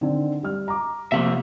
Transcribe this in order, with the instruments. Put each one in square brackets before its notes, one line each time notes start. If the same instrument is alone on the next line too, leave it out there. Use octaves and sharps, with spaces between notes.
[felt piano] D3 D#3 C4
G3 F6
A#5 D6
[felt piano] C3 [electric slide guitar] F3 A#3 E5